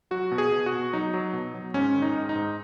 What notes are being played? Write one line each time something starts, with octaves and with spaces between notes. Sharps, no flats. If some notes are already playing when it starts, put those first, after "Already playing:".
F#3 F#4
B2
G#4
B2
F#4
B2
F#3 D#4
F#3
B2
F#3
G#2 C#4
D#3
D#4
G#2
D#4
G#2